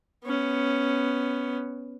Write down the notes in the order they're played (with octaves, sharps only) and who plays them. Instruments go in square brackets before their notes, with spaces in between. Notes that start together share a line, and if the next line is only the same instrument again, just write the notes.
[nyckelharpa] B3 C#4